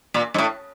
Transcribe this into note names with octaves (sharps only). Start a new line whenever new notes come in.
A#2
G#2
A2